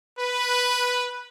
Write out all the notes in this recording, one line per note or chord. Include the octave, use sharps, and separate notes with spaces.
B4